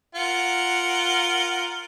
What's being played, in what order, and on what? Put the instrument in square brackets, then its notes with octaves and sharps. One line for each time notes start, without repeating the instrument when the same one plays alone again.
[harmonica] F4 A#4 F#5